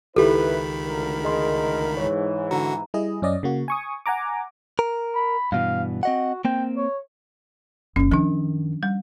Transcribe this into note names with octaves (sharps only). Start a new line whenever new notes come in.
C#2 D#3 E4 G4 A4 B4 B5
D2 A#4
G#4 D#5 C6
G#2 E3 C#5
D3 F#4 A#5
G3 E4 G#4 D#5
F#2 C#4 D5 D#5
C#3 A#3 F#4
G#5 C#6 D#6
F#5 G#5 A#5 D6
A#4
B5
G2 B2 E3 F5
C4 F#4 D#5 F#5
A#3 C4 G5
C#5
F#1 D3 C#4
F#2 D#3 F3 D4
G3